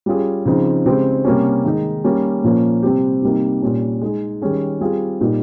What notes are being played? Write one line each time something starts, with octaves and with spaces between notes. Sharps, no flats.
G3 C#4 F4 G#4
C#3 F3 C4 D#4
C#3 G#3 C4 G4
C3 G3 A#3 C#4
D#3 G#3 D#4
G3 A#3 C#4
A#2 F3 A#3 C#4
C3 G3 C4 G4
C3 G3 A#3 D#4
A#2 G3 C#4
G#3 D#4 G#4
D#3 G3 C#4 G#4
G3 C4 F4 G#4
A#2 G3 A#3 D#4